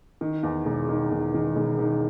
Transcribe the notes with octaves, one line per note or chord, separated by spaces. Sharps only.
D#3
E2
E1
D#3
E1
D#3
E1
D#3